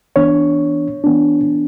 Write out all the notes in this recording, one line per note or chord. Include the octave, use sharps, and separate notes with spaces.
E3 B3 D4 C#5
E3 B3 D4